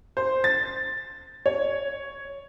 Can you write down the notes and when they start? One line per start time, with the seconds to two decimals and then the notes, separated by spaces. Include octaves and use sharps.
0.17 C5
0.44 A6
1.46 C#5